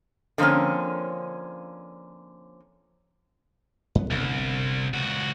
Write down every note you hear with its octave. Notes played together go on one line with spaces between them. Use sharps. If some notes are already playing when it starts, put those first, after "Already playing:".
D3 F3 A#3 C4 C#4
F#2 B3
G1 C2 D3
C#2 F#4